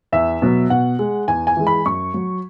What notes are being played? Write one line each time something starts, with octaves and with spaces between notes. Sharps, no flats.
E2 E5
B2 F#3
B2 F#5
G#3
E2 G#5
G#5
E3 G#3
B5
F#2 C#6
F#3